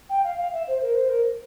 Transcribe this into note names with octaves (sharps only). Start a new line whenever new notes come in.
G5
F5
F5
E5
C5
A#4
C5
A#4